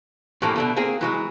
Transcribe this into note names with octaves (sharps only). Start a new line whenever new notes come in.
G2 A#2 E3 F3 A3 A#3
B2 D3 A3
A#3 C4 G#4
E3 F#3 G#3